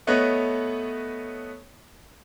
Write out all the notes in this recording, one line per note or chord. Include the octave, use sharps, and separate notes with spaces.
A3 B3 B4 C#5 D#5